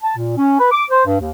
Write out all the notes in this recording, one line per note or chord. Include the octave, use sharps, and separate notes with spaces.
A5
A#2
C#4
B4
D6
C5
G2
D#2